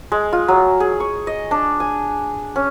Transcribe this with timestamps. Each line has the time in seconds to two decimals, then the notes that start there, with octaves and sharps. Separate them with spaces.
0.12 G#3
0.33 F4
0.48 F#3
0.80 G#4
1.00 C#6
1.27 D#5
1.51 D4
1.80 G#5
2.56 C#4